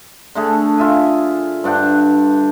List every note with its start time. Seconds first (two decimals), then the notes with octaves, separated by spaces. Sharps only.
0.35 D3 A3 G#4
0.78 F4 E5 G#5
1.64 G2 D4 F#5 G5